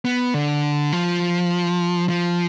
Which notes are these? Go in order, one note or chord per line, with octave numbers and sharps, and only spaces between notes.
B3
D3
F3
F3